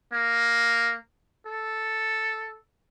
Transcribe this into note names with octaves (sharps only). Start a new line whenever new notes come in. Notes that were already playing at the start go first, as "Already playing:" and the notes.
A#3
A4